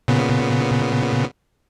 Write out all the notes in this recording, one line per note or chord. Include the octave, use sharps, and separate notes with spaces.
A#2 C#3 B3